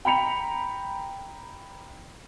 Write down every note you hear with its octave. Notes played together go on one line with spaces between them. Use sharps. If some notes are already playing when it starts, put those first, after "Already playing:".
G5 A#5 B5 C#7 F7